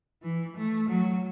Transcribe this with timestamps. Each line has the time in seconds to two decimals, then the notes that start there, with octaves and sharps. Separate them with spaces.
0.23 E3
0.57 A3
0.89 F#3